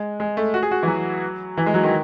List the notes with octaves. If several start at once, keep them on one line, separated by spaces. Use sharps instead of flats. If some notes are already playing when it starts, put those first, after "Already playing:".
Already playing: G#3
G#3
A3
F#4
G#4
F#4
E3
F#3
E3
G#3
F#3
D#3